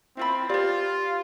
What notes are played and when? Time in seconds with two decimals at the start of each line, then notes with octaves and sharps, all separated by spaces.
0.17 C4 E4 F4 B5
0.49 F4 G4 C5 D5